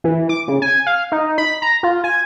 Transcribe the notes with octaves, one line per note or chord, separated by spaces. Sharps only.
E3
D6
C#3
G#5
F5
D#4
B5
A#5
F4
G#5